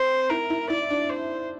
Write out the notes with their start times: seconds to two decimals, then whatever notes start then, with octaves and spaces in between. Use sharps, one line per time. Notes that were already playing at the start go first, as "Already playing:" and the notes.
Already playing: C4 C5
0.30 E4 A#4
0.50 E4
0.70 E4 D5
0.90 D4
1.10 C5